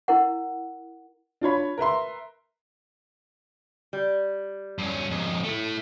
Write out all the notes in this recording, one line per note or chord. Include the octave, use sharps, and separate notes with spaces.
E4 A#4 F#5
D4 F4 C#5 B5
A#4 B4 E5 C6
G3
G2 C#4
F2 G#2
A3 E4